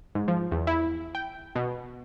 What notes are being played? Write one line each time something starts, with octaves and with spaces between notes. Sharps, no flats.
G#2
F3
E2
E4
G5
B2